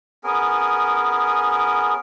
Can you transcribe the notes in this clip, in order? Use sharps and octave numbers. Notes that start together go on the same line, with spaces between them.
B3 C#4 G#4 A#4